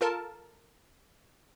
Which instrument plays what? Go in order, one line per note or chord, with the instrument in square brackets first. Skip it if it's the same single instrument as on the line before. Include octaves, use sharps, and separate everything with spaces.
[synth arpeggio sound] F4 A4 A#4 A5